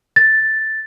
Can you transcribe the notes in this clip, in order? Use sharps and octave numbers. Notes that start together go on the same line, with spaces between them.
A6